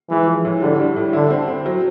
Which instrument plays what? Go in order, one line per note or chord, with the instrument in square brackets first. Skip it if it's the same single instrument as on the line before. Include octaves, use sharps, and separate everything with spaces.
[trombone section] E3 [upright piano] G#3
[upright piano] F3
A2
[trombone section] D3 [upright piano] G3
[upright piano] G3
A2
[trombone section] D3 [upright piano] E4
[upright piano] C4
C4
F#3